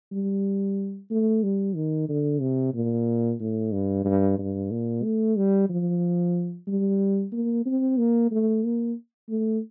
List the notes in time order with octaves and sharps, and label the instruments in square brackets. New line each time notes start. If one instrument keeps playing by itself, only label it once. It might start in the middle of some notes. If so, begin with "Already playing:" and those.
[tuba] G3
A3
G3
D#3
D3
C3
A#2
A2
G2
G2
G2
A#2
A3
G3
F3
G3
A#3
C4
A#3
A3
A#3
A3